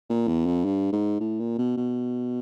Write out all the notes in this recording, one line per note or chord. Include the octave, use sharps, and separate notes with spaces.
A#2
E2
F2
G2
G#2
A2
A#2
B2
B2